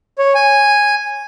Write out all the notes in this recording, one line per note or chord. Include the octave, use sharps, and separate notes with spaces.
C#5
G#5